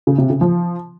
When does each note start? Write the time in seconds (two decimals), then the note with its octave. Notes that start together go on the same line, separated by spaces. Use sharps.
0.07 C#3
0.18 C3
0.30 C#3
0.41 F3